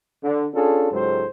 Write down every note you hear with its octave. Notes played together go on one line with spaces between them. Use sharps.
D3
C#4 D4 F4 G#4 A4
C#2 G#2 F#3 G4 A4 C5